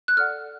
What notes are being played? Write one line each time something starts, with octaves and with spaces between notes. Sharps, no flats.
F#6
A4 D5 F#5 F6